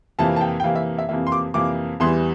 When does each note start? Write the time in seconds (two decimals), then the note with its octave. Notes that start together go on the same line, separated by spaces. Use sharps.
0.19 F2 C3 E3 A#3 A5
0.36 A5
0.41 G5
0.60 G5
0.63 F2 C3 E3 A#3 F5
0.75 E5
0.98 E5
1.09 F2 C3 E3 A#3 E5
1.27 C6
1.32 D6
1.54 F2 C3 E3 A#3 D6
2.00 E2 E3 G3 C6